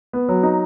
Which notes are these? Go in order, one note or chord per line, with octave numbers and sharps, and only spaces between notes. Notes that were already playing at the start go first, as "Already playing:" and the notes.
B3
F#3
D#4